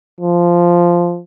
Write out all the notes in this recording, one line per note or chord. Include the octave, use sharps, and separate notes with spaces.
F3